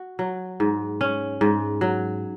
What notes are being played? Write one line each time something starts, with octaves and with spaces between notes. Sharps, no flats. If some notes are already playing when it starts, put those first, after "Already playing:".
Already playing: F#4
F#3
G#2
C#4
G#2
F#3